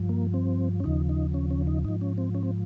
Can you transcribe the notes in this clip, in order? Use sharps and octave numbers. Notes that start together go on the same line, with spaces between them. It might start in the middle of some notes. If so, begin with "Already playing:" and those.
Already playing: G2 F3
A#3
C4
C#4
D#2 C#3 F3 D#4
D#4
C#4
C#4
D#4
G#2 F3 D#4
C#4
C4
C#4
C4